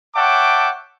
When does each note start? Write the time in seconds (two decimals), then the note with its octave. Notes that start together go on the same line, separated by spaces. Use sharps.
0.16 C#5 E5 F#5 G5 A5 D6